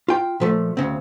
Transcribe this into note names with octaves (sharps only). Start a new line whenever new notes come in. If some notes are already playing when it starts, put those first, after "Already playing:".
F4 G5
A#2 F3 A3
D2 C#3 C4